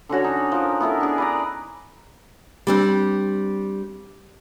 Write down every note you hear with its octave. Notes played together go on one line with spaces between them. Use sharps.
D3 C#4 F#4 C#5
D#4
F3 A#4
B3 E4 A4 A#4
D4 G#4
B4 D5 A#5
G3 C4 D4